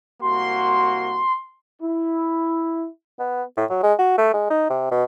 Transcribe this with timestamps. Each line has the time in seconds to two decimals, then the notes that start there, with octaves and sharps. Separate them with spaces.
0.21 C2 A#3 F#4 C6
1.81 E4
3.19 B3
3.57 A2
3.70 F#3
3.83 G#3
3.99 F#4
4.18 A3
4.33 G#3
4.50 D#4
4.70 C3
4.91 B2